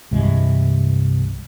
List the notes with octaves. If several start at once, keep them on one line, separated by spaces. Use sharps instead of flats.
C2 G2 E3 G#3